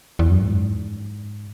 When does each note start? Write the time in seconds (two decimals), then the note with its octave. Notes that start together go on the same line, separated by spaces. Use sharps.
0.19 E2
0.30 F#2
0.42 G#2